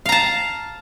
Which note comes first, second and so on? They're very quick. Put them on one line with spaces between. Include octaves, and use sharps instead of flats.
F5 A#5 A5